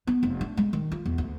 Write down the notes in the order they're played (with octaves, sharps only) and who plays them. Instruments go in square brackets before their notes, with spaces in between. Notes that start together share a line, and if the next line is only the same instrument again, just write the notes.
[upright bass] B3
F1
D4
G#3
D#3
F4
E2
D2